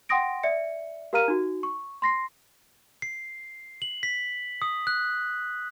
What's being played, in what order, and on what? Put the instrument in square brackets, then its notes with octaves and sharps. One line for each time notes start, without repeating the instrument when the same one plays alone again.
[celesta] F#5 G5 C6 D#6 A#6 D7
D5 E5 C#7
G4 A#4 F5 A#5 F6 D#7
D#4 F#4
C#6
C6 A#6 C7
[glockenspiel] C7
F#7
B6
D#6
F#6